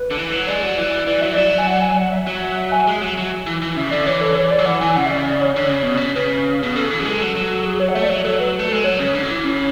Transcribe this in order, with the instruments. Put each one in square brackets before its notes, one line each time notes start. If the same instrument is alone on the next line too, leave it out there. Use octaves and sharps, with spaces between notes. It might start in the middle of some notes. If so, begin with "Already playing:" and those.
Already playing: [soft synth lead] B4
[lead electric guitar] D3
E3
F#3
[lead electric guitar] G#3 [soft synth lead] D5
[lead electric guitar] F#3
E3
[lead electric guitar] E3 [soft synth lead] D5
[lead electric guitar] F#3 [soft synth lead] E5
[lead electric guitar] E3
[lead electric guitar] F#3 [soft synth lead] D5
[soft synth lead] G#5
F#5
G#5
F#5
E5
[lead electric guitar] F#3
[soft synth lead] E5
G#5
[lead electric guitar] G#3
F#3
F#3
E3
E3
[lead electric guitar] C#3 [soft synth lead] E5
[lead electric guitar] D3 [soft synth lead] D5
[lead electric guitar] E3 [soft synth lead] C#5
[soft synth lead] A4
C#5
D5
[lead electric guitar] F#3
[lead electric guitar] E3 [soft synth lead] F#5
[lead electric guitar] E3 [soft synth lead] G#5
[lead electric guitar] C#3 [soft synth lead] F#5
[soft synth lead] E5
D5
D5
C#5
[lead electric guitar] D3
C#3
B2
C#3
[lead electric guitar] C#3 [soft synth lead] B4
[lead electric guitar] B2
[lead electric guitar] C#3 [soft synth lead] A4
[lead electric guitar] E3 [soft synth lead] A4
[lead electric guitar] F#3 [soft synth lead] G#4
[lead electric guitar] G#3 [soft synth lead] A4
[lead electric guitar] F#3
F#3
[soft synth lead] G#4
C#5
F#5
[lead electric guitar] A3 [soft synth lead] E5
[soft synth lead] D5
[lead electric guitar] F#3 [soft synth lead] C#5
[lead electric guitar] F#3 [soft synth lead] A4
[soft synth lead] B4
[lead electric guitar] A3 [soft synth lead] B4
[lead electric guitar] G#3 [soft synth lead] A4
[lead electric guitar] F#3 [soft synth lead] C#5
[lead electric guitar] C#3
D3
F#3
E3
C#3